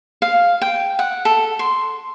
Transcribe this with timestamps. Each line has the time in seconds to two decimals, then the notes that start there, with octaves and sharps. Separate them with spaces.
0.22 F5
0.62 G5
0.99 F#5
1.25 A4
1.59 C6